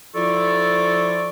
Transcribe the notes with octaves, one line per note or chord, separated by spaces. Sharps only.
F3 E4 F4 A4 D5 C#6